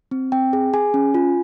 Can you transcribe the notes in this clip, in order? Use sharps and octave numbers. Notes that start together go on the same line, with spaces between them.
C4
C4 G5
G#4
G#4 G#5
C#4
F4